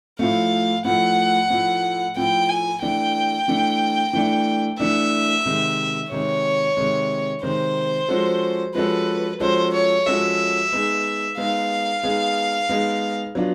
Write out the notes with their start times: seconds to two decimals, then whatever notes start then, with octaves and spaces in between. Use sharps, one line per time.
0.19 A2 F3 A3 F5
0.85 A2 F3 A3 F#5
1.50 A2 F3 A3
2.16 A2 F3 A3 G5
2.49 G#5
2.82 E3 A3 D4 G5
3.48 E3 A3 D4
4.13 E3 A3 D4
4.79 E3 A3 D4 E5
5.45 C3 D#3 G#3
6.11 C3 D#3 G#3 C#5
6.77 C3 D#3 G#3
7.42 C3 D#3 G#3 C5
8.09 F3 G#3 C#4 F#4 A4
8.74 F3 G#3 C#4 F#4 A4 B4
9.40 F3 G#3 C#4 F#4 A4 C5
9.73 C#5
10.06 F3 G#3 C#4 F#4 A4 E5
10.72 G#3 B3 D#4 G#4
11.38 G#3 B3 D#4 G#4 F5
12.03 G#3 B3 D#4 G#4
12.69 G#3 B3 D#4 G#4
13.35 F#3 B3 D4 F4